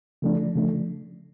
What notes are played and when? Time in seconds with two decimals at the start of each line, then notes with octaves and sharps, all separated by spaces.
0.22 C#3 F3 A3 D4
0.55 C#3 F3 A3 D4